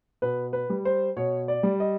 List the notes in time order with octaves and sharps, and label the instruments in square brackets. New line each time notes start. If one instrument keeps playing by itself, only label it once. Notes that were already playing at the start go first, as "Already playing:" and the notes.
[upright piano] B2 B4
B4
G3
C5
B2 C#5
D5
G3
D#5